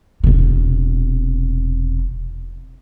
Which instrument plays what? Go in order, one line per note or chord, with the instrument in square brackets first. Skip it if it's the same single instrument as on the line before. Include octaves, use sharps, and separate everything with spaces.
[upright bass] E1 C3